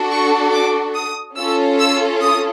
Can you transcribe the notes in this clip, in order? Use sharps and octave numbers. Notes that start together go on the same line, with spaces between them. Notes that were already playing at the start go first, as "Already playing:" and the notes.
Already playing: D4 F#4 A4
C#6
D6
D#6
C#4 F4 A4 E6
E6
D#6